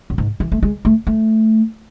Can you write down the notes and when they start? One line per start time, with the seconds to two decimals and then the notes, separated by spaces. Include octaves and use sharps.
0.10 F#2
0.18 G#2
0.40 E3
0.52 A3
0.63 G#3
0.85 A3
1.07 A3